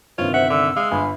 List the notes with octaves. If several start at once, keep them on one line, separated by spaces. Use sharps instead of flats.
G1 C3 D#3 F4 C5 C#5
C5 E5 F#5
D3 E6
G#3 F5
G1 G#5 B5